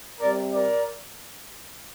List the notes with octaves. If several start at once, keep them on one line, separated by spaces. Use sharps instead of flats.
C3 G3 A#4 D5
A#4 D5